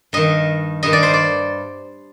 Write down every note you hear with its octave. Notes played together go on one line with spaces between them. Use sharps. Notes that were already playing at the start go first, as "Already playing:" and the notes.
G2 D#3 D#5
G2 D#3 D#5
D5
C5
D5